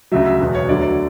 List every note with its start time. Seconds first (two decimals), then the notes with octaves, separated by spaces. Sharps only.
0.12 D2 C#3 F#3 E5
0.26 E5
0.40 E1 E2 B2
0.55 C#5
0.68 D2 D3 F#3 D5
0.82 D5